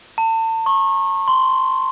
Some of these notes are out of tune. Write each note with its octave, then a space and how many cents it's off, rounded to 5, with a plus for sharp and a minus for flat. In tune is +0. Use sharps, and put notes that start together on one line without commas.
A5 +40
C#6 -30
C6 -10